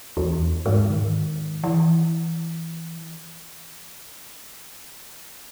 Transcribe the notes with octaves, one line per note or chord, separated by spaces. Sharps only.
E2
G#2
D#3
E3